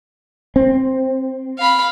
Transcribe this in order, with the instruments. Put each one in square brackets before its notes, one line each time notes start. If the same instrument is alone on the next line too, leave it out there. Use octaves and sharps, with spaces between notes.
[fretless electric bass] C4
[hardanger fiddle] F5 B5